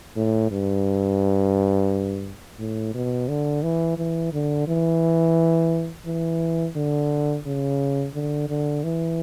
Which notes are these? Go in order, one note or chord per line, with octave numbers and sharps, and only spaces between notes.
A2
G2
A2
B2
D3
E3
E3
D3
E3
E3
D3
C#3
D3
D3
E3